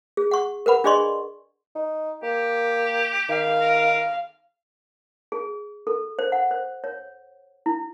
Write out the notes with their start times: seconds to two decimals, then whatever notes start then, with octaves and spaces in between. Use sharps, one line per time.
0.17 G#4
0.31 F#5 C#6
0.66 A#4 B4 F#5 B5
0.84 D4 G#4 D5 D#5 C6 C#6
1.75 D#4
2.23 A#3 G4
3.29 D#3 F5
3.61 A#4
5.32 G#4
5.87 A4
6.19 C5
6.32 F#5
6.51 C5
6.84 C#5
7.66 E4